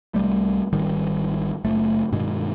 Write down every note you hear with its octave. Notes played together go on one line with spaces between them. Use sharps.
C2 G3 A3
G#1 D#3 G3
F#1 A3
G2 B2 D#3 G#3